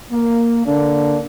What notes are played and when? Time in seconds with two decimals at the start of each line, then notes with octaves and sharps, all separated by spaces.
0.11 A#3
0.66 D3 A#3 D4